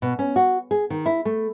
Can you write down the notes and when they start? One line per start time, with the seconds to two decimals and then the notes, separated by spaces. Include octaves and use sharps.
0.02 B2
0.19 C#4
0.36 F#4
0.71 G#4
0.90 D#3
1.06 E4
1.25 A3